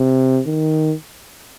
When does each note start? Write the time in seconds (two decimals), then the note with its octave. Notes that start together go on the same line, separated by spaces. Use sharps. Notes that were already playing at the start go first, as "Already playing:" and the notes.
Already playing: C3
0.46 D#3